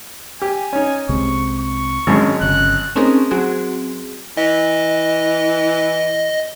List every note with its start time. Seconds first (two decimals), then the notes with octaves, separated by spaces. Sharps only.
0.42 G4 G#5
0.73 C#4 D#4
1.09 C2 C3 G#3 C#6
1.59 C#6
2.07 G#1 F#2 D#3 G#3 C#4 D4
2.41 G1 C#3 F#6
2.96 A3 C4 C#4 D#4 G#4 A#4
3.31 F#3 C4 F#4 G#4
4.37 E3 D#5